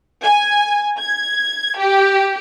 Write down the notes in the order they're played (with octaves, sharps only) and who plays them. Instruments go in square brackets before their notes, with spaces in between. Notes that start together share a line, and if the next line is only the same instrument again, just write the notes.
[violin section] G#5
G#6
G4